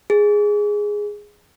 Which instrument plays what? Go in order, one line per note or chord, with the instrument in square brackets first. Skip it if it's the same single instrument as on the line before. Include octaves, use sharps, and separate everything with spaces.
[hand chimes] G#4